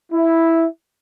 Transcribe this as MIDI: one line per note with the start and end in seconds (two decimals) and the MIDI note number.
0.12 0.66 64